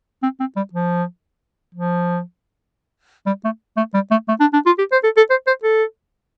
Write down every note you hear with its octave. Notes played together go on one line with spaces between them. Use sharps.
C4
C4
G3
F3
F3
G3
A3
A3
G3
A3
A3
D4
D4
F4
G4
C5
A4
A4
C5
C5
A4